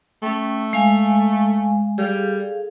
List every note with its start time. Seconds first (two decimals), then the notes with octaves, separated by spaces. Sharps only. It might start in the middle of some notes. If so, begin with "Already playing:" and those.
0.22 A3 C#4 G5
0.73 G#3 F5 G#5
1.98 G3 G#4 A4 F5